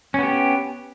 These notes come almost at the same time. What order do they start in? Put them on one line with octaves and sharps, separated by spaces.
C#4 B3 G4